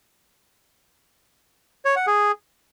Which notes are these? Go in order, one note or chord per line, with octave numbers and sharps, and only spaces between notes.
C#5
F#5
G#4